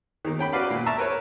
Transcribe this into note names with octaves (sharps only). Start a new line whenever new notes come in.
D#3 A#3
C#4 G5 B5
F#4 B4 D5 F5 B5
A#2
E5 A5 A#5 C#6
A#4 B4 C#5